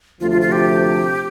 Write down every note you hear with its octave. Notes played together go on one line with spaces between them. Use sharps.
D2 C3 F3 A3 F4
F4
F4
G4